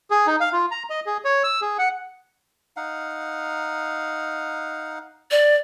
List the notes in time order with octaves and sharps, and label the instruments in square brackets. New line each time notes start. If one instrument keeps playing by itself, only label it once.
[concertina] G#4
D#4
F5
F4
A#5
D#5
G#4
C#5
E6
G#4
F#5
[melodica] D#4 F5 F#5
[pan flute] D5